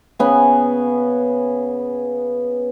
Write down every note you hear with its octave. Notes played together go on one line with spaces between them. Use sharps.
C#3 B3 G#5